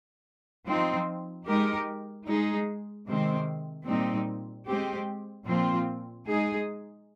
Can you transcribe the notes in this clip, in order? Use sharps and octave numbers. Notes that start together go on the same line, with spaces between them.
F3 C4 D#4
G#3 D#4 G4 A#4
G#3 D#4 G#4
C3 D#3 G#3 C4
A#2 G3 C4 D#4
G#3 C4 G4
A#2 F3 C4 F4
G#3 D#4 G#4